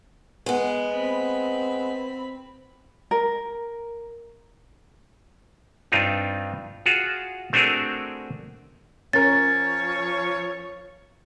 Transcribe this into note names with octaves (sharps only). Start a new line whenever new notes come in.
G#3 B3
C4 B5
A#4
G2 C4 D4 D#4 F4
F4 F#4 G#4
A3 C4 D4 F#4 G#4 A#4
F3 C#4 A#4 C#5 A6